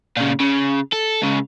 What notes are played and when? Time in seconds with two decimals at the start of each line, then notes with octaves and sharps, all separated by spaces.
0.17 A#2 C#3
0.40 C#3
0.93 A4
1.22 C#2 C#3